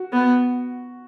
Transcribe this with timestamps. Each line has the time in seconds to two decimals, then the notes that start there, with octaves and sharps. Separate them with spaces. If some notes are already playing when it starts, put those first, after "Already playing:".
Already playing: F#4
0.13 B3